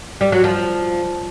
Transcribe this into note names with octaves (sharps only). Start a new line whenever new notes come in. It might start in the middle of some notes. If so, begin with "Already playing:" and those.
G3
F#3
F3